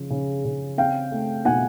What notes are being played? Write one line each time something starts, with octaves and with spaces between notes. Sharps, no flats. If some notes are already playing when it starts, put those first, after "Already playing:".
Already playing: C#3 F3
C#3
C#3
C4 F5 G5
A3
B2 F#5 G#5